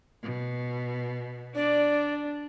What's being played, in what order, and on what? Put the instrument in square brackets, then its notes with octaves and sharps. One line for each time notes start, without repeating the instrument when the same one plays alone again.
[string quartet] B2
[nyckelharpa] D4 [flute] D5